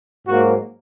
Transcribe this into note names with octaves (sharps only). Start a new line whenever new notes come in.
G#2 F#3 A#3 F#4